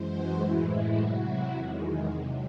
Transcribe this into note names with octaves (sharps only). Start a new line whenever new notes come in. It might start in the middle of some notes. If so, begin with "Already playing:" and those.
Already playing: F#2 E3 G#3 C5
F#4
A2 E3 G#3 E4
C3 F#3 F#4
E4
E2 D#3 G#3
C3 F#3